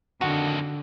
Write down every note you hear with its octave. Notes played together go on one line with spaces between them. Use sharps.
F2 D3 D#3 F#4